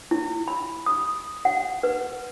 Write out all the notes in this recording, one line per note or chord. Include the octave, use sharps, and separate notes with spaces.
E4
B5
D#6
F#5
B4